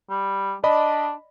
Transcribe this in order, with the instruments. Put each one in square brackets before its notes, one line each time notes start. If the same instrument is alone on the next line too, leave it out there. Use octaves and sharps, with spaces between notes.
[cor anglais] G3
[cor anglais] D4 [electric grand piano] D5 D#5 B5